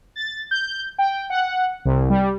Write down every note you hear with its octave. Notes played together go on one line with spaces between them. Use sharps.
A6
G6
G5
F#5
C2
G3